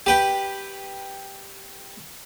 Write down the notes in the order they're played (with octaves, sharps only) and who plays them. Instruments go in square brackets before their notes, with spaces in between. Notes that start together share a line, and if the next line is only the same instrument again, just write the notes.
[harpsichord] G4 B4 G5